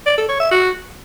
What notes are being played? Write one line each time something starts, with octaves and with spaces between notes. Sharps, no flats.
D5
A4
C#5
E5
F#4